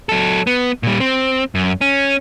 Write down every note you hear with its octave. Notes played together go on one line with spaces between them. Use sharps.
F#3 A4
B3
A#2 G3
C4
F#2
C#4